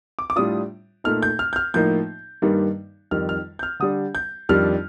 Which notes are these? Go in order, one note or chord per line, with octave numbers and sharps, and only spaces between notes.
D6
D6
A2 G3 D4 F4 D#6
A#2 A3 D#4 F6
G6
F6
G6
F6
A2 F3 A#3 D#4 G6
G2 D#3 G3 A#3 D#4
F2 D#3 G3 F6
F6
G6
F6
D3 G3 D4 D#6
G6
F2 D#3 G3 D4 F6